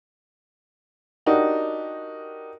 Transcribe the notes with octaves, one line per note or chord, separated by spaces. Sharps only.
D4 D#4 F#4 G4 A#4